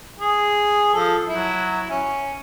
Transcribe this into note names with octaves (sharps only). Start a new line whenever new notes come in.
G#4
F3 A4
F#3 E4
C#4